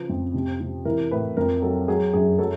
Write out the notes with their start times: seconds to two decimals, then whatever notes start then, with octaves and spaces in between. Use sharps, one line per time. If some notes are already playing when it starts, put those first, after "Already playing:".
Already playing: C#3 F3 B4
0.09 F2
0.34 C3
0.60 C3
0.85 E3 A#4
1.11 A2 B4
1.37 F2 A#4
1.62 F#3 A4
1.88 F#3 G#4
2.13 F#2 G#4
2.39 F#3 A4